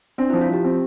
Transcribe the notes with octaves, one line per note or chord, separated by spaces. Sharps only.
C4 D4
F3 E4
F4
F3 G4
C4